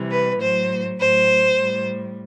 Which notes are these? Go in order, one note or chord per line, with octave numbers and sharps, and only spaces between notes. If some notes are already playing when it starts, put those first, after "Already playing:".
Already playing: C3 E3 G3
B4
A2 F#3 C5
A2 F#3 C5
A2 G3